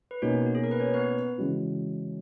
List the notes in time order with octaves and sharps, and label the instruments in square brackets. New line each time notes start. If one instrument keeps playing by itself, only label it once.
[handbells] B4
[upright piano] B2 A#3 D#4 [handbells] C#4 C#5
[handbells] F#4
G#4
A#4
B4
C#4 C#5
B3 B4
[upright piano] C#3 E3 G#3 C#4 F#4